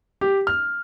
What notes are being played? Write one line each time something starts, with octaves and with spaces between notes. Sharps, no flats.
G4
F6